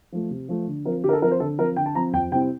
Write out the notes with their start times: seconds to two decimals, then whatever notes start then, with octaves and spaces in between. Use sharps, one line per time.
0.12 F3 A3
0.31 C3
0.49 F3 A3
0.68 D3
0.85 F3 C4 A#4
1.04 D3 G4
1.09 A#4
1.13 A4
1.22 F3 C4 A#4
1.31 C5
1.40 D3 A4
1.58 F3 C4 A#4
1.76 D3 G5
1.86 A5
1.95 F3 C4 A#5
2.13 F2 G5
2.32 C3 G3 C4 E4 G5